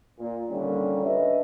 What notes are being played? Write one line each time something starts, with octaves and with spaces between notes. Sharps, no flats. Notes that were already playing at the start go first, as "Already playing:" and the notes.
A#2
A#2 D3 D#3 G3 C#4
D4 B4 D#5 E5